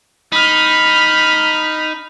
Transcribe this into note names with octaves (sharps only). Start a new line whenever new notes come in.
D#4 B5 F6